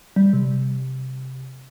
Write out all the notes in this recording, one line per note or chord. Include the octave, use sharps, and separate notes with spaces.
G3
C3